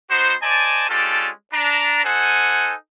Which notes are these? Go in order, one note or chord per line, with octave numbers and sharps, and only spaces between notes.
B3 D#4 F#4 C5
C5 D5 D#5 G#5 A5
G#3 C#4 D4 F4 G4 A4
D4 A#5
D#4 A4 C5 F#5 G#5